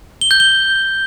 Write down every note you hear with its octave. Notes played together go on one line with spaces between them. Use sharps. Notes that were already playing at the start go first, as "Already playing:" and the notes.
G7
G6
G7